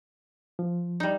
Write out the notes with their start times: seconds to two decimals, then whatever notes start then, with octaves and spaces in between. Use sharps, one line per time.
0.59 F3
1.00 G3 D#4